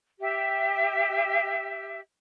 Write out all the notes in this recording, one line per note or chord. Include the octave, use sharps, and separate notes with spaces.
G4 E5